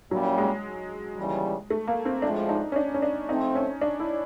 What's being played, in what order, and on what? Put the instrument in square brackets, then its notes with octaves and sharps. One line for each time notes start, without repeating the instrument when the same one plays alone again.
[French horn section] A#2 G3 A#3 C#4 E4 [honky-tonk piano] F#3
[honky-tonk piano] G#3
[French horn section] D#2 C#3 E3 G3
[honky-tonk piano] A3
A#3
C4
[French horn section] A2 F3 G#3 [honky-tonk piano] D4
[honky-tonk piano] D#4
C#4
D4
C#4
D4
[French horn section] F3 A3 C4 [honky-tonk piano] D#4
[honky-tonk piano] C#4
D4
E4